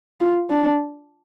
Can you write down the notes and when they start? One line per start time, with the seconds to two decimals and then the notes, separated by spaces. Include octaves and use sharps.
0.21 F4
0.50 D4